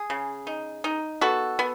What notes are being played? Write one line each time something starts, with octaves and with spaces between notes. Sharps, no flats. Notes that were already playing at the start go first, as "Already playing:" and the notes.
Already playing: G#4
C#3
D#4
D#4
B3 F#4 A4
B3